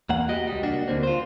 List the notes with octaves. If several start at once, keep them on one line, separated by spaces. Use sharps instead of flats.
E2 A#3 F#5
F#4 G4 D#5
C#2 G3
A#3 D4 F#4
D2 G#2 D3 A#3 C4
F4 C5